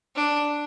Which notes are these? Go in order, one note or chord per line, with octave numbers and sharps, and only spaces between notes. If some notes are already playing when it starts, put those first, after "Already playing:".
D4